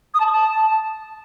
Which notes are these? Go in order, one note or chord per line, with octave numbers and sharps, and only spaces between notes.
D#6
A5
D#6
A5